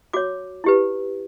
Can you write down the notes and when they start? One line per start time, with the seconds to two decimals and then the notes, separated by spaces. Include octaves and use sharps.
0.13 F#4 C#5 D6
0.64 E4 G4 B4